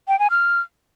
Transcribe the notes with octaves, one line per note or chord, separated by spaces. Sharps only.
G5
G#5
F6